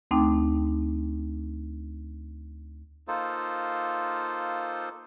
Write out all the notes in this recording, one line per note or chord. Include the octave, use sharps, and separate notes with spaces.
D2 A3 C4 D#4 G5 D6
A#3 D#4 F4 A4 C5